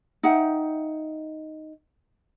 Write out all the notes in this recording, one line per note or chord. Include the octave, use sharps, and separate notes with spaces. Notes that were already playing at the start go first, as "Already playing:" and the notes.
D#4 E5 F#5 G5